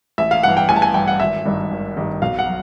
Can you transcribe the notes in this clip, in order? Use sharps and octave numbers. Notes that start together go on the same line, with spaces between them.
A1 E5
F5
G2 E3 F#5
G5
A1 G#5
A5
G#5
G2 E3 G5
F#5
G#1 E5
G2 D#3 G3
G#1
G2 D#3 G3
B1 F5
F#5
F#3